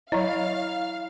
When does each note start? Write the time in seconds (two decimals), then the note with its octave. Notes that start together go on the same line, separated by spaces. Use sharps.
0.12 F#3 E4 C#5 D#5 F5 A#5